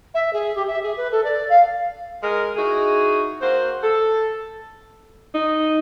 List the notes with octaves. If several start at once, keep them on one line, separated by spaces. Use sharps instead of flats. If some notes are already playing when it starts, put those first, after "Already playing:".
E5
G#4
G4
E5
G#4
B4
A4
D5
F5
G#3 A#4
D#4 E4 F#4 G#4
A#3 F#4 C5
A4
D#4